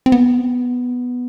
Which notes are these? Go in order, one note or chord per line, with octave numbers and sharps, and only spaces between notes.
C4
B3